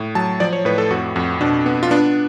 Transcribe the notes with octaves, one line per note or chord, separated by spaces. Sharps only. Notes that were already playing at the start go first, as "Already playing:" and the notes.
Already playing: A2
F#3 A5
F3 D5
C#5
A2 B4
A4
F2 F#4
F2 F#4
B2 D4
B3
F4
B3 D4